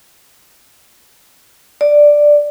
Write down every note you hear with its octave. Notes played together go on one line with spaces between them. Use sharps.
D5